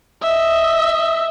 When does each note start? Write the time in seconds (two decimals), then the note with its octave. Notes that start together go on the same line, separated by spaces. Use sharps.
0.23 D#5 E5